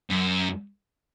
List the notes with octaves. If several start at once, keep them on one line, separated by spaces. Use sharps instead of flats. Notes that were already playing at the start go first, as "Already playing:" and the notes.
F#2